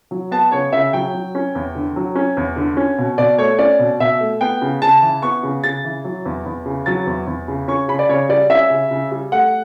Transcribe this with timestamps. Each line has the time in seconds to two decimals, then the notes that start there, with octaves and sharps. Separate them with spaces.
0.11 F#3
0.31 B3 A5
0.52 C#3 C#5
0.73 C#3 E5
0.93 F#3 G5
1.14 F#3
1.35 C#4
1.55 E2
1.75 D3
1.96 F#3
2.15 C#4
2.37 E2
2.56 D3
2.77 C#4
2.98 B2
3.18 B2 D5
3.38 A3 C#5
3.59 C#4 D5
3.79 B2
4.00 B2 E5
4.20 A3
4.41 B3 G5
4.62 C#3
4.82 C#3 A5
5.02 E3
5.22 B3 C#6
5.43 C#3
5.64 C#3 A6
5.84 E3
6.04 F#3
6.26 E2
6.46 E2
6.66 C#3
6.86 F#3 A6
7.07 E2
7.27 E2
7.48 C#3
7.68 C#4 C#6
7.88 C#3 B5
7.99 D5
8.09 C#3 C#5
8.29 G3 D5
8.50 C#4 E5
8.70 C#3
8.91 C#3
9.11 G3
9.32 A3 F#5